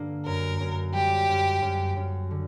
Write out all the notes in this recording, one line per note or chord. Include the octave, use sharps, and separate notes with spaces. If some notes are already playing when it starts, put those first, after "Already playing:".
Already playing: G2 D3 A#3
F#2 A#4
F#2
G3 G4
F#2
F#2
F#2
D3